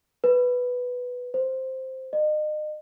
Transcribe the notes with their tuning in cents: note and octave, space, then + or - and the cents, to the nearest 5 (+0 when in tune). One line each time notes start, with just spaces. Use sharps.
B4 +0
C5 +0
D#5 -35